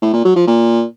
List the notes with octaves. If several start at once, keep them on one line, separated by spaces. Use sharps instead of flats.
A2
A#2
F#3
F3
A#2